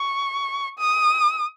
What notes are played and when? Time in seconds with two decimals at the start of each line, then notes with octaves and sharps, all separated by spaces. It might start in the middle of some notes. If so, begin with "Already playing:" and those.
Already playing: C#6
0.79 D#6